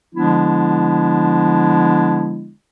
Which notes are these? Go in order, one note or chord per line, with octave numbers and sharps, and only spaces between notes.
D3 F3 G#3 B3 D4 E4